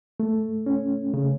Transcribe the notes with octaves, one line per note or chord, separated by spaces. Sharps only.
A3
C#4
C#3